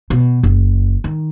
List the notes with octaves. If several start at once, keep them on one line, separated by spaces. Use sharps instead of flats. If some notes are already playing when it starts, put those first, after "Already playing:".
B2
F#1
D#3